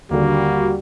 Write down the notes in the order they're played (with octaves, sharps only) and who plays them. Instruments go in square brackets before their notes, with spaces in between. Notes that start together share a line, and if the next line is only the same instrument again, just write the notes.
[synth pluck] D#2 D3 [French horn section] G3 F#4 [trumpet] A#3